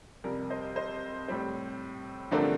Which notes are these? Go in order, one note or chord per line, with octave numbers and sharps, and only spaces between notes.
F2 C3 G3 A#4 D5
C5 D#5
C5 D#5
A2 G3 C4
G2 D3 F3 A3 C4 A#4 D5
D5